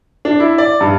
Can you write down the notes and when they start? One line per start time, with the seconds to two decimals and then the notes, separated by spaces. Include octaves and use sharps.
0.25 D4
0.40 E4
0.58 D5
0.81 G2